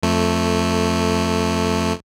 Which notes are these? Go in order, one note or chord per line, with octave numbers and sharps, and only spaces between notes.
F2 A3